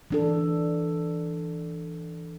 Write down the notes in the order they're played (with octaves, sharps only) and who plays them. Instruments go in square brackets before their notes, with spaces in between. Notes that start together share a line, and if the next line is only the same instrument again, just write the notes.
[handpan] E3 D4 A4